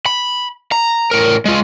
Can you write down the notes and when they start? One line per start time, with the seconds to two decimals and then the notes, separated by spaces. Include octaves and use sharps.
0.06 B5
0.72 A#5
1.11 A2 A#4
1.45 G#3 F4